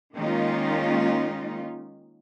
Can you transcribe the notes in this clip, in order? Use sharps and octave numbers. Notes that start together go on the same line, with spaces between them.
D#3 G#3 A#3 C#4 D#4 F4